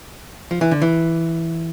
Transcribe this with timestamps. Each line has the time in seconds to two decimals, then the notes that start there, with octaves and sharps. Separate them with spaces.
0.51 F3
0.61 E3
0.71 D3
0.82 E3